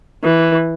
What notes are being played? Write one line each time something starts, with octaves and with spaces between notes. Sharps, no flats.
E3